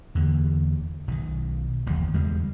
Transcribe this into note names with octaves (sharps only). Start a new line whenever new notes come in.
E2 D3 A#3
B1 D#3
F#1 D#2 F3
E2 C#3 G3 G#3